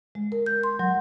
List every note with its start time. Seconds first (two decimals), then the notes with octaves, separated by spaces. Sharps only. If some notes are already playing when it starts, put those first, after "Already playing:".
0.15 G#3
0.32 A#4
0.46 G6
0.63 C6
0.79 F#3